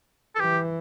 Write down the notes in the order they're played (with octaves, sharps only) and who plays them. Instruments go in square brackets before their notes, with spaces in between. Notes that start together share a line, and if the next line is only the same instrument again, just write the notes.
[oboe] A4
[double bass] E3 [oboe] G4